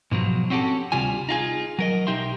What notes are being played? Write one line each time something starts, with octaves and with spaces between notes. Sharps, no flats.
G#2 B2 F3 F#3
C4 C#4 F#4 G4 A4
D2 C3 G3 F4 G#5
D#4 F4 G#4
F#3 A#4 D#5
B1 D#4 G4 E5 C6